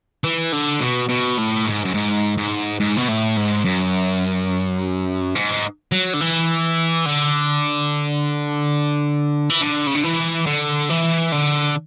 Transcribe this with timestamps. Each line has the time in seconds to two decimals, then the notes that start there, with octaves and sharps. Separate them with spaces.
0.24 E3
0.53 D3
0.81 B2
1.09 B2
1.38 A2
1.66 G#2
1.85 F#2
1.94 G#2
2.37 G#2
2.80 G#2
2.97 B2
3.08 A2
3.37 G#2
3.65 F#2
5.35 G#2
5.92 F#3
6.14 D3
6.21 E3
7.06 D3
9.50 E3
9.61 D3
9.87 C#3
9.95 D3
10.04 E3
10.46 D3
10.90 E3
11.32 D3